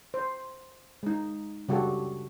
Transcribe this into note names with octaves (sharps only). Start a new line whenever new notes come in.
C5
G#3 D#4
C#3 G3 F#4 G4 A4